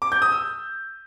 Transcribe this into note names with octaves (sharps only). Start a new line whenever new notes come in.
D6
G6
D#6
E6